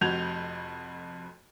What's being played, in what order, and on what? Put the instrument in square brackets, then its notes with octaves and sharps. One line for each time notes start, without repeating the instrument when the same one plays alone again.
[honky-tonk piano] F1 F2 F#4 G6 G#6 F7